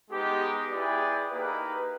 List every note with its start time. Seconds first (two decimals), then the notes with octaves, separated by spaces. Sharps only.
0.11 G#3 B3 D#4 G4
0.71 E4 G#4 B4 D5 G5
1.30 A#3 D#4 G4 B4